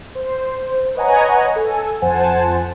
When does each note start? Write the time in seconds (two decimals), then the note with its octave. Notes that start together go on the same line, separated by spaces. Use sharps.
0.15 C5
0.95 B4 C#5 D#5 F#5 G#5 A#5
1.56 A4 G#5
2.02 F2 C5 F#5 G#5 A5